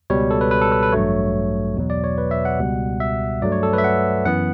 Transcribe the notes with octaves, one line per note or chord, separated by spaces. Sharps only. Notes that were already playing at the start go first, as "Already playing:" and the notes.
C#2 B2 G3 C#5
A4
B4
B4
A4
B4
B4
A1 G2 F#3 A3 C#5
E2 B2 F#3
D5
C#5
B4
E5
F#5
C#2 B2 G3
E5
G2 F#3 A3 D5
C#5
A4
B4
E5
F#5
F#2 E3 B3 F#5